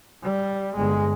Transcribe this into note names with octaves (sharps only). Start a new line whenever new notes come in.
G3
G1 G#3